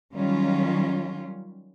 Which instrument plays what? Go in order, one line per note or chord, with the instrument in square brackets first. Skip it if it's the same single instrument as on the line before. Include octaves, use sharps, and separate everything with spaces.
[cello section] D#3 F#3 G3 C#4 F4